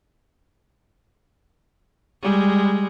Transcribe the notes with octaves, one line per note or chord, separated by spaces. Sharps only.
G3 G#3